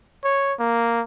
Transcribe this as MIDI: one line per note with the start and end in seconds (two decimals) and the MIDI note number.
0.24 0.53 73
0.59 1.01 58